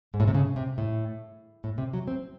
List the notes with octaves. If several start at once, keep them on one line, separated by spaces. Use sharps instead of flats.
G#2
A2
C3
C#3
C3
A2
A2
C3
F#3
C4